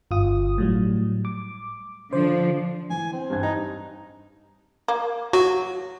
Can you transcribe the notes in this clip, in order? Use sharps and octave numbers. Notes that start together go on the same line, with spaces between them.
G1 F4 D#6
A2 F#3 G3
D6
D3 F3 D4 C5
E3 G#5
C4
G2 G#6
D#4
A#3
F#3 F#4